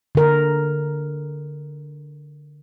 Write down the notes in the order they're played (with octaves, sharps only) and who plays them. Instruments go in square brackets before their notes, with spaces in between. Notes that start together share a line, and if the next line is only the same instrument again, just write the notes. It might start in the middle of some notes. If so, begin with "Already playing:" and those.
[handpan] D3 A#4